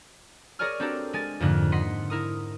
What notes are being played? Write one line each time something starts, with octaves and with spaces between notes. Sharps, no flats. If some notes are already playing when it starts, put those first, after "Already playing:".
G#4 A#4 C#5 D5 G#5 F6
C4 D4 F#4 G4 A4 A#4
G#3 G#5 A6
F2 G#2 D3 A#3 F#6
D#5 F#5 C6 B6 C#7
E4 A#4 D#6